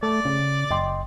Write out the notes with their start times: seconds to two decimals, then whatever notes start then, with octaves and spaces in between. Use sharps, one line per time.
0.03 A3 D5
0.25 C#3
0.71 F#1 D#5 G5 C6